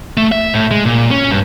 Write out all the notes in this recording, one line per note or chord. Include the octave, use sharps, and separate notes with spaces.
A3
E5
A2
G#3
A#2
C#4
G2